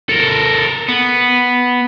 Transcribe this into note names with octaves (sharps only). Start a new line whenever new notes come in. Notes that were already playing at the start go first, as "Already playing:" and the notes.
A4 A#4
B3